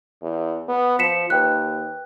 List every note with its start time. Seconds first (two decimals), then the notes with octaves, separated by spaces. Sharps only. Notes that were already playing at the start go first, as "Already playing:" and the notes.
0.22 E2
0.69 B3
0.99 F3 B6 C#7 E7
1.30 D#2 B4 G5 F#6